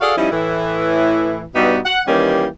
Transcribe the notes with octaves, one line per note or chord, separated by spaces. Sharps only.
F#4 G#4 A4 D5 F5
F3 G3 C#4 D#4 E4
A2 E3 E4
G2 B2 G3 B3 D#4 F#4
F#5
D#3 E3 G3 A#3 C#4 G4